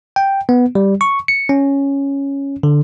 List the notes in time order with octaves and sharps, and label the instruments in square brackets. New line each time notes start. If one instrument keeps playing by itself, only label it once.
[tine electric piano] G5
B3
G3
C#6
C#7
C#4
D3